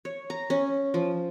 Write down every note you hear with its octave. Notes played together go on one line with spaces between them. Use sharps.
C#5
A#5
C#4
F3